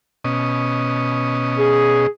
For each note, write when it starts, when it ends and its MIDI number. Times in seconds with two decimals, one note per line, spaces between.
0.24 2.07 47
0.24 2.07 61
0.24 2.07 75
1.59 2.07 68